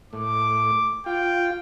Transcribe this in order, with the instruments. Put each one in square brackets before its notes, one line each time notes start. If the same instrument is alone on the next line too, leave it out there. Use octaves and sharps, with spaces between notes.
[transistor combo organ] A2 [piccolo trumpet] D6
[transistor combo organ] F4 [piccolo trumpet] G5